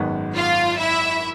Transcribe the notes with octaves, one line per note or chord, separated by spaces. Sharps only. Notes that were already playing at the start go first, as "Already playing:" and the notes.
Already playing: G#1 F#2 D#3 G#3 B3
F4 F5
E4 E5